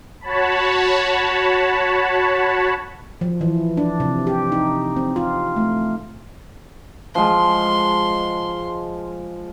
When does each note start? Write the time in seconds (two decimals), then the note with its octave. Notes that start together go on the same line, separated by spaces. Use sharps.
0.21 F#4 C#5 A5 B5
3.21 F3
3.41 E3
3.77 D4
4.00 C3
4.27 G4
4.52 D#4
4.97 C4
5.16 F4
5.56 A3
7.15 F3 G#3 C6